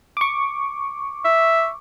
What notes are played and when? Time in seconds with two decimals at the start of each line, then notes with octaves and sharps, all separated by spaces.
0.17 C#6 D6
1.25 E5